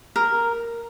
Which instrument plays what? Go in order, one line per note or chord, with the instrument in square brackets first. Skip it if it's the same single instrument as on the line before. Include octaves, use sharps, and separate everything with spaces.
[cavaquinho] A#4